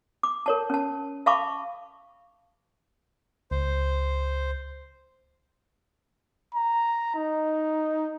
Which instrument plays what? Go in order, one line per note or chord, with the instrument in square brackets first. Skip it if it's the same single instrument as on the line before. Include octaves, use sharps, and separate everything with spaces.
[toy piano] D6
A#4 C#5 A5
C#4 A5
E5 F5 A5 B5 C#6 D6
[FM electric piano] C#2 [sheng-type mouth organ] C5
[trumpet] A#5
D#4